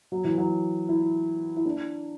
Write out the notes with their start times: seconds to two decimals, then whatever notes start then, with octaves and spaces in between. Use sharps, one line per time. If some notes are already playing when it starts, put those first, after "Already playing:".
0.12 F#3
0.24 E3
0.38 F#3
0.89 E4
1.57 E4
1.65 D4